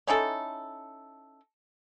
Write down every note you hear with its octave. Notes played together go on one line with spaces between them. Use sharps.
C#4 D#4 E4 A4